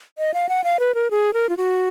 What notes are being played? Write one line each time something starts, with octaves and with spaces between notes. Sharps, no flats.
D#5
F5
F#5
F5
B4
A#4
G#4
A#4
F4
F#4